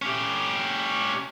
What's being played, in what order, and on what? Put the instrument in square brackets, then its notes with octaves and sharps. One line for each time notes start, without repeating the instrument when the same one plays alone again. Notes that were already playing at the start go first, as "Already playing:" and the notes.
[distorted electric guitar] C#4 G4